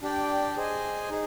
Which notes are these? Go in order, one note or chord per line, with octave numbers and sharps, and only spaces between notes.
D4 G4 D5 G5
G#4 C5 D#5 G#5
D#4 G#4